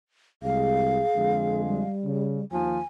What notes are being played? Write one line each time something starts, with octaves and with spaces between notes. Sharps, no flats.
C2 G#3 G#4 F5
F2 D3 G#3
G3
C#3
D#2 F3 G#5